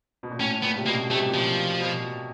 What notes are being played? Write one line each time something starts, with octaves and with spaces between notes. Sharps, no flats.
B2
A#2
A2 C#4
A#2 B3
C3
B2 A#3
C3 A3
A#2
B2 F3
B2